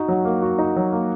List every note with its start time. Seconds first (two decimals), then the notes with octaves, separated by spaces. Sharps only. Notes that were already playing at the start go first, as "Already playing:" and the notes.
Already playing: D#4 F#4
0.08 F#3
0.25 A#3
0.42 F#4
0.58 D#4
0.76 F#3
0.93 A#3